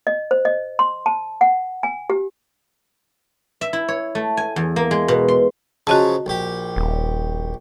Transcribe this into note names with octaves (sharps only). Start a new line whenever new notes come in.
D#5
C5
D#5
C6
A5
F#5
G#5
G4
E5
E4
C#5
A3
G#5
E2
A#3
G#3
B2
C6
C#3 F3 F#3 F#4 D#5 A5
A#1 G4
D#1